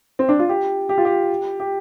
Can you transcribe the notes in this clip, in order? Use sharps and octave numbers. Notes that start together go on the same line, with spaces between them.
C4
D4
F4
G4
G4
F4
G4
G4